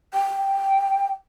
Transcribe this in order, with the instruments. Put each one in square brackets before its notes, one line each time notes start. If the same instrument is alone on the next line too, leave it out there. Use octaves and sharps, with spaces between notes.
[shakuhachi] G5